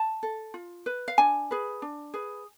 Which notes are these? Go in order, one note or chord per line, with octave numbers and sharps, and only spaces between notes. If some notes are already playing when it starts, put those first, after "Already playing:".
Already playing: A5
A4
F4
B4
F5
D4 G#5
G#4 B4
D4
G#4 B4